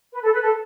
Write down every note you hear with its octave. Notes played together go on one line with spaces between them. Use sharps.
B4
A4
B4
A4